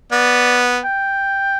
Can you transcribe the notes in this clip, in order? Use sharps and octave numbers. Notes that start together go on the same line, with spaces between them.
B3 D5
G5